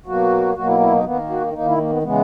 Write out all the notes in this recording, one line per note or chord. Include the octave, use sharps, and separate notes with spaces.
B2 F#3 A#3 F#4
B2 F#3 A#3 F#4
E4
E4
D#4
D#3 A#3 B3
F#4
D#4
D#3 A#3 D#4
E4
A#3
B3
C#3 E3 G#3 B3